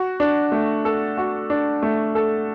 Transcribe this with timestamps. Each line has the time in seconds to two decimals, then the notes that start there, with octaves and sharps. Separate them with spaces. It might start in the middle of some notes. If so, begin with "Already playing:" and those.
Already playing: F#4
0.20 D4
0.52 A3
0.85 A4
1.18 F#4
1.50 D4
1.83 A3
2.15 A4